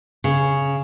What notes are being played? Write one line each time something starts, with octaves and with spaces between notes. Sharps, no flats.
C#3